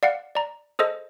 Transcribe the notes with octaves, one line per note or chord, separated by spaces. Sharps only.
D5 F5 F#5
D5 A#5
G#4 A4 C5 D#5